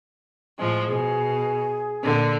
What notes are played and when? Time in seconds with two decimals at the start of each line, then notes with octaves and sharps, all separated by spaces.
0.59 A2 F3 G#3
0.87 B2 G#4
2.03 A#2 D3